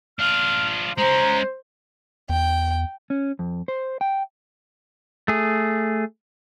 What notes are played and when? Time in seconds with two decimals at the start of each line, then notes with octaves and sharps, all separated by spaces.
0.19 D4 F4 F6
0.98 G#3 C#4 C5 A#5
2.29 E2 G5
3.10 C#4
3.39 F2
3.68 C5
4.01 G5
5.28 A3 G#4